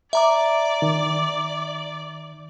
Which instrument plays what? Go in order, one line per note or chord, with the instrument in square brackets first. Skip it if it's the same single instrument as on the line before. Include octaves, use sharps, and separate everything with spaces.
[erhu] D5 [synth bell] E5 A#5 D6
[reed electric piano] D#3